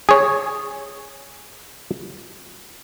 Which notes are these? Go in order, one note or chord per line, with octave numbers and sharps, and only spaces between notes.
G#4 C#5